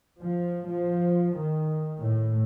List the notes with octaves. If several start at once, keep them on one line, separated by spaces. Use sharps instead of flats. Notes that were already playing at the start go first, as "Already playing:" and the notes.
F3
F3
D#3
A2